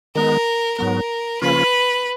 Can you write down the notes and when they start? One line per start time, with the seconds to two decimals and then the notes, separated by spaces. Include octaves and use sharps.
0.15 D#3 G#3 B3 A#4
0.78 G#2 F#3 B3 A#4
1.41 C#3 F3 A#3 C#4 F4 B4